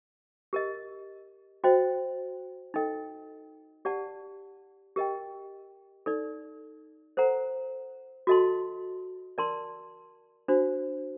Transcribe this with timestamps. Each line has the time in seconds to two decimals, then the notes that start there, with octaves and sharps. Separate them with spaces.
0.53 G4 A#4 D#5
1.64 F#4 C5 D#5 G5
2.74 D#4 A4 D#5 G5
3.85 G4 D5 F#5 A5
4.96 G4 A#4 D#5 G5
6.06 D#4 A4 D5
7.17 A4 C5 F#5 A#5
8.27 F#4 A4 D#5 A5 C6
9.38 A#4 D5 A5 C6
10.48 D4 F#4 C5